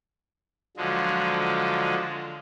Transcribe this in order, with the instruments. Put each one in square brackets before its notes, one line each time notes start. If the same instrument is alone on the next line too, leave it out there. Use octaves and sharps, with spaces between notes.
[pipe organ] D3 F3 F#3 G#3